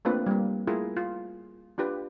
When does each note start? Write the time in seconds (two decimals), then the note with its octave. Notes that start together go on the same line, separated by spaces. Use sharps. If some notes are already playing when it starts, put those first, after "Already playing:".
0.05 A3 A#3 C4 D4 F4 B4
0.26 G3 A#3
0.67 A3 E4 F4 G#4 A#4
0.96 F4
1.78 D4 F4 G4 B4